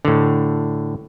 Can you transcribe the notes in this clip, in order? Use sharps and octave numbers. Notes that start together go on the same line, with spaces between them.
A2 D3